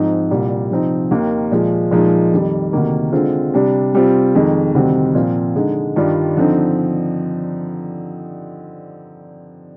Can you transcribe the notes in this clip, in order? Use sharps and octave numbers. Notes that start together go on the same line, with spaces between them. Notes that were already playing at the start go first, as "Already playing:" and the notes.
Already playing: G#2 F3 C4 D#4
C2 A#2 G3
C3 F3 C4 D#4
D#2 D#3 A#3
A#2 F3 G#3
A#2 F3 G#3 D#4
F2 D#3 G3
D2 C3 D#3 A#3
D3 G#3 C4 F4
C3 G3 D4
C3 G3 C4 F4
F2 D#3 G#3 D#4
D2 C3 D#3 G3 C4
A#2 F3 C4 F4
D3 G#3 D#4
G2 D#3 G3 D4 F4
D3 F3 C4 D#4